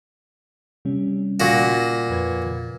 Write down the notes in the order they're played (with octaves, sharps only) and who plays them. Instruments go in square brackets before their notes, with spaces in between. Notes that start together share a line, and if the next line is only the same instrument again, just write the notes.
[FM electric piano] C3 G3 C#4
[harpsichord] A#2 F#4
[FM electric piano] F2 B4 G#6